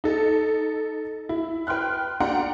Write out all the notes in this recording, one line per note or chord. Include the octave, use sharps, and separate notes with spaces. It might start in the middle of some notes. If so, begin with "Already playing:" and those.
D#4 A4
E4
B4 G5 C6 F6 F#6
D4 F#4 F#5 G5 A#5 C6